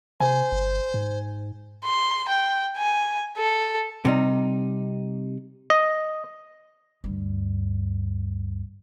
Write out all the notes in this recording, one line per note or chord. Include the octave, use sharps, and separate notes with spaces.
C3 C5 G#5
G1
G#2
C6
G5
G#5
A4
C3 G3 D#4
D#5
D2 G2